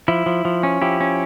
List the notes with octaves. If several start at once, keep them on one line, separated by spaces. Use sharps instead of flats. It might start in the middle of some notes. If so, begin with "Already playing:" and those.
F3 E4
F3
F3
C#4
F3 E4 G4
C#4